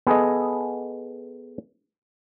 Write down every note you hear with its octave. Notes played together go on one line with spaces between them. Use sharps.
B3 G#4 A4 D#5